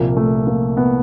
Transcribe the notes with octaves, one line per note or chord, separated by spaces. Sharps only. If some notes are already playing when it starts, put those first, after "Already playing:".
Already playing: C2 A#2 F3 A#3
A3
A#3
B3